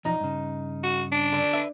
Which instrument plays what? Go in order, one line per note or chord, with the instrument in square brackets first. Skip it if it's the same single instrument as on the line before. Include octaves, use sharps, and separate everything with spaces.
[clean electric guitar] B1 E2 F3 [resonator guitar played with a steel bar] D#4
[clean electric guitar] G2 C#3
[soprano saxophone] F#4
D4
[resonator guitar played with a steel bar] D3
[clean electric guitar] B4 E5